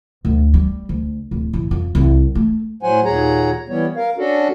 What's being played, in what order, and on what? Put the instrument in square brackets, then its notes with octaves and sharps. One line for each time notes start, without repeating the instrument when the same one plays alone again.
[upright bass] D2
G3
D2
D1
A1
F2
C2
A3
[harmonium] A2 F#3 C5 F#5 G#5
D#2 A#2 G#4 C#5 F#5 A#5
E3 G3 B3 C#5
A#4 F5
C#4 D4 F#4 A4